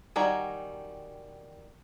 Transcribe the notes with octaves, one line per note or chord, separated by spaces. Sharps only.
D#3 G3 F#4 G#5 A#5